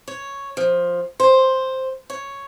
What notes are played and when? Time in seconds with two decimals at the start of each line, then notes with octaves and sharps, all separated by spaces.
0.08 C#5
0.57 F3
1.20 C5
2.10 C#5